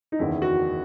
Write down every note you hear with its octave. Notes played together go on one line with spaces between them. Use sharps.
D#4
F#1 E2 D#3 E4
F#4